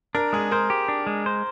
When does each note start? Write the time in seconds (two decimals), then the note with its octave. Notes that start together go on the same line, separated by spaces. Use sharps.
0.15 D4 A#4
0.33 G#3 G#4
0.51 A#4 C5
0.70 G4
0.88 D4
1.07 G#3
1.26 C5